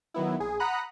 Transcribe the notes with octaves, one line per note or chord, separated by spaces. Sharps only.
D#3 F#3 B3 E4
A#1 G#4
F#5 A#5 B5 D#6 F#6